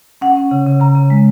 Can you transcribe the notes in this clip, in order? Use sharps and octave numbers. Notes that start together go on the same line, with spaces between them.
C#4 F#5
C#4
C#3
C#3
C#3 A#5
C#3
G#3